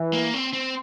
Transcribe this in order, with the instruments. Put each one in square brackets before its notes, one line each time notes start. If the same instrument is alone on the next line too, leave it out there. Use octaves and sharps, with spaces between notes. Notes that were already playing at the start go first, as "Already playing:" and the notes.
Already playing: [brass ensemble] E3
[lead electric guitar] A#3
C4
C4